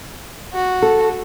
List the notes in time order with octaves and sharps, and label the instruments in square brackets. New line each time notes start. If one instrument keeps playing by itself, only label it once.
[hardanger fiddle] F#4
[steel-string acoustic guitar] A4